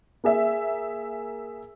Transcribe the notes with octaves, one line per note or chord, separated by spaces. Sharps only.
A#3 G#4 E5